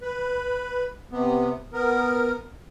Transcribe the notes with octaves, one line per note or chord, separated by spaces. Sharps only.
B4
C3 B3
B3 A#4